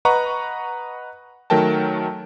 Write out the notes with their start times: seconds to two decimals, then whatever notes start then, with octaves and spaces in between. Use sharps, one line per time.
0.05 B4 D#5 F#5 A#5 C#6
1.50 D#3 F#3 A3 A#4 G5 A5